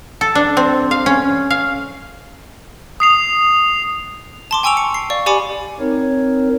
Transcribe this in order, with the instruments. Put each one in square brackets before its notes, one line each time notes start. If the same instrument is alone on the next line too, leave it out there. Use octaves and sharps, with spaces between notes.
[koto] A4
D4
C4
F5
C#4
F5
[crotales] D#6 C7 F7
[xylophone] A5 C6 D6
G5 G#5 C#6 E6 D7 F7
C#7
C7
D5 F5 C#6
G4 D5 G#5 B5 D6 C#7
[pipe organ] C4 D#4 A#4 C#5